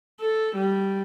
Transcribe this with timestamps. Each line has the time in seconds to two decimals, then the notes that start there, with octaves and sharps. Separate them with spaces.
0.20 A4
0.56 G3